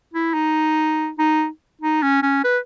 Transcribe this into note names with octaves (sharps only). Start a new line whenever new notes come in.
E4
D#4
D#4
D#4
C#4
C#4
B4